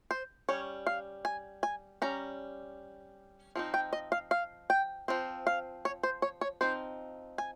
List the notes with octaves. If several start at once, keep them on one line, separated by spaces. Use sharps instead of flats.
C5
G3 C#4 C#5
F5
G#5
G#5
G3 C#4 A#5
F3 C4 D#4
G5
D#5
F5
F5
G5
F3 C4
F5
C#5
C5
C#5
C#5
F3 C4 D#4 C5
G#5